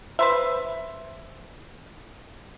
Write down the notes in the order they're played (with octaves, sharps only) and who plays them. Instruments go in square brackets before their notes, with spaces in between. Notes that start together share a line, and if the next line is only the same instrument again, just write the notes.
[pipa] B4 C5 E5